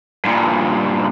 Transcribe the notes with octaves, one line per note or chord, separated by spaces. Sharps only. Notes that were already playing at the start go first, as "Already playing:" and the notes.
G2 A#2